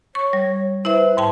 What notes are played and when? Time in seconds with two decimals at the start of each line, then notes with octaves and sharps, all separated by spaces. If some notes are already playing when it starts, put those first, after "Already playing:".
0.15 C#5 C#6
0.33 G3
0.85 E4 B4 C5 E5
1.17 G#2 G5 A5